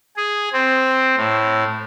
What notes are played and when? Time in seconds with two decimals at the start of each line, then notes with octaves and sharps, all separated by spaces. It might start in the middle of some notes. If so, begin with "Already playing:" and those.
0.16 G#4
0.53 C4
1.17 A2